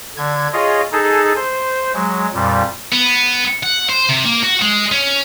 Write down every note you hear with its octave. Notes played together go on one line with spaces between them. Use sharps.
D3 G#6
F4 G#4 C#5 D#5
D#4 G#4 A4
C5
F#3 G#3
F2 A#2 G3
B3
F#5
C5
C3
A#3
F#4
G#3
C#4